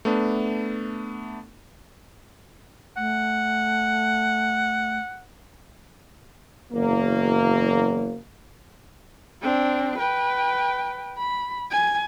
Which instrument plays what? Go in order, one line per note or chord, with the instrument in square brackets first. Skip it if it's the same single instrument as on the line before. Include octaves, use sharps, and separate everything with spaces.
[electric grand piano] A3 B3 D4
[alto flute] A3 [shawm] F#5
[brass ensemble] F#1 E2 F#3 A#3
[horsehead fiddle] C4 D4
B4 G5
B5
G#5